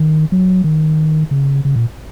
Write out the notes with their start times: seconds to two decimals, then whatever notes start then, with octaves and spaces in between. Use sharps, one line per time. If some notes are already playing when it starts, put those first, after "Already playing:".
Already playing: D#3
0.32 F#3
0.64 D#3
1.31 C#3
1.65 C#3
1.76 A#2